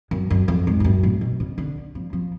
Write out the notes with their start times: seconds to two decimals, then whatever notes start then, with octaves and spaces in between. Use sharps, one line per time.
0.11 F#2
0.30 F#2
0.48 F2
0.67 G#2
0.80 F2
0.84 F#2
1.03 A2
1.21 B2
1.40 C#3
1.58 D3
1.95 F3
2.13 F3